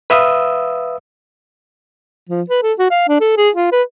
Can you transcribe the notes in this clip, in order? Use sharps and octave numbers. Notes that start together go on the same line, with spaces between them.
B4 E5 F5 D#6 E6
F3
B4
A4
F#4
F5
D4
A4
G#4
F4
B4